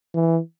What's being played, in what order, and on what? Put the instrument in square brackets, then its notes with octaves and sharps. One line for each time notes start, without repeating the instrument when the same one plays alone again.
[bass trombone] E3